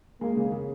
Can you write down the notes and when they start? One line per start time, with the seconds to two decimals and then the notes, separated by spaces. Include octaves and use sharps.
0.21 G#3 A#3
0.36 C#3
0.52 C#3